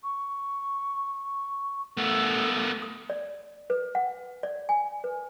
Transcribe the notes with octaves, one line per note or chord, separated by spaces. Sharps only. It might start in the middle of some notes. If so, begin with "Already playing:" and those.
C#6
A3 B3
D#6
D5
B4
F#5
D5
G#5
B4